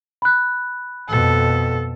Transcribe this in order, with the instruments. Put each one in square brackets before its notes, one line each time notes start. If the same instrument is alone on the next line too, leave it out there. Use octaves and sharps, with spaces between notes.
[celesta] B5 F#6
[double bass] F2 B2 [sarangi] A4